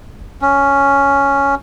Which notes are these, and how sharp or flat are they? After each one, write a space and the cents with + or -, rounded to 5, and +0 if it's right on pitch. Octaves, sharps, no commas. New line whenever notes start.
C#4 +5